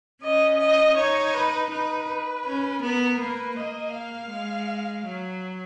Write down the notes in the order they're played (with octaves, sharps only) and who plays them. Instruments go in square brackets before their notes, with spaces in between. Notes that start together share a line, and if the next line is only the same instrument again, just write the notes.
[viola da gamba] C#4 [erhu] D#5
[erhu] D#5
[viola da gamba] D#4 [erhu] C#5
[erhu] B4
[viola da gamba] D#4 [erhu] B4
[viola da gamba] C#4
[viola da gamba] B3 [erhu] A#4
[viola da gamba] A#3 [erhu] B4
[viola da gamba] A#3 [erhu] D#5
[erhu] F5
[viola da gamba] G#3
F#3